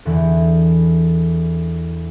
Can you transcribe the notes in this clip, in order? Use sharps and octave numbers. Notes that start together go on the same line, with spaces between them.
E2 D3 E3